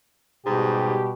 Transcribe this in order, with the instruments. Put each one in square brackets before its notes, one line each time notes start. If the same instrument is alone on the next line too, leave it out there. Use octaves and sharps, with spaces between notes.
[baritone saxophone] G#2 [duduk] B2 [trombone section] G3 G4